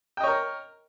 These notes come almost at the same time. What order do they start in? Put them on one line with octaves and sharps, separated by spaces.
G5 D#5 C#5 A#4